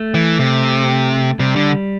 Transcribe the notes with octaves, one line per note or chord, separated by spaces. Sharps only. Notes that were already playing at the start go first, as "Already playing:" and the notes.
Already playing: A3
E3
C3
C3 G3
D3